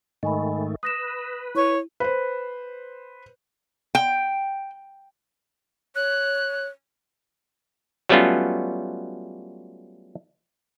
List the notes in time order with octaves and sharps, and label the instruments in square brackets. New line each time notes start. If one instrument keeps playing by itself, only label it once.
[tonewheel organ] G#2 D#3 A3 [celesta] D#5 G#5 B5
[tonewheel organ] B4 [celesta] D#6 A#6 E7
[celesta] E4 [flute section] C#5 C#6
[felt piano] B4 C5
[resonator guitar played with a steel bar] G5
[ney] C#5 [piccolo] F#6
[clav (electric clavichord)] F#3 G3 A3 B3 C#4 F4